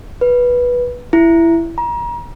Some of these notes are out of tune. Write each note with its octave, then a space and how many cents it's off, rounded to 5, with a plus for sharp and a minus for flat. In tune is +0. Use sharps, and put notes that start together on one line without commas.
B4 -10
E4 +15
A#5 +35